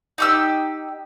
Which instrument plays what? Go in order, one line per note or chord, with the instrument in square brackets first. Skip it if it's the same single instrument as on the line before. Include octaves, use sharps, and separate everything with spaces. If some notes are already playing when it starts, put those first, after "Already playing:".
[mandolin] D#4 G4 E6